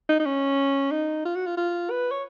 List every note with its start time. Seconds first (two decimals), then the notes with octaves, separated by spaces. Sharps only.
0.09 D#4
0.20 D#4
0.26 C#4
0.92 D#4
1.25 F4
1.36 F#4
1.46 F4
1.57 F4
1.91 B4
2.12 C#5